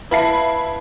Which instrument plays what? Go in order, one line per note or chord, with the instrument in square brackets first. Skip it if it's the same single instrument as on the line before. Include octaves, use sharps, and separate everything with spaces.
[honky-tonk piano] E4 B5 C7 [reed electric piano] B4 F5 A5